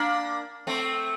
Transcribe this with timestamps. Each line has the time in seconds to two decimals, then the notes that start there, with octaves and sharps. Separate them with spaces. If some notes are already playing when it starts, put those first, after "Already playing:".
Already playing: A#3 D4
0.67 A3 C4